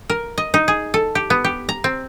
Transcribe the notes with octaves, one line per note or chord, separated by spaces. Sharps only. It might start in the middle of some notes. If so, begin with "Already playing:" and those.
A#4
D#5
D#4
G#4
A4
G4
B3
G4
A#5
C4